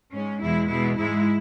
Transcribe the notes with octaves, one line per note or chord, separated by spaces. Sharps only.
G#2 G#3 C#4
E2 B2 G#3 E4
B2 G#3 E4
G#2 G#3 E4